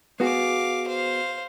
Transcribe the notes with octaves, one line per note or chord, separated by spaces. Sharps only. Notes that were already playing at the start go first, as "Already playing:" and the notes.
B3 F#4 G#4 F5 D6
C5 F5